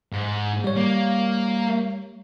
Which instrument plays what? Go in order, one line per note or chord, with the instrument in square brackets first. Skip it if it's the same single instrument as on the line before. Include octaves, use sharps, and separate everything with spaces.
[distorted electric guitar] G#2
[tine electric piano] G3 C#5
[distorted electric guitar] A#3